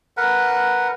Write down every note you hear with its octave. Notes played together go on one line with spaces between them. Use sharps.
A#4 B4 F#5